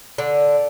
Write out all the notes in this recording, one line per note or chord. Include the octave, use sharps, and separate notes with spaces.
D3